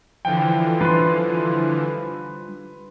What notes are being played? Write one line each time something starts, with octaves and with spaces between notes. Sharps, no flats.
D3 E3 F3 G5
G3 D4 F4 B4 C6